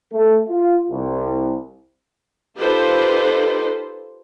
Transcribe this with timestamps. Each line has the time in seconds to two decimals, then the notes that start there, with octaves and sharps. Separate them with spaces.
0.13 A3
0.48 F4
0.91 C2
2.58 D#4 F4 G4 A4 B4 C5